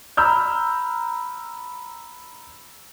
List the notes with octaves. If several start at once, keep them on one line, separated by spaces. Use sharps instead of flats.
A#5 B5 E6 F6 G6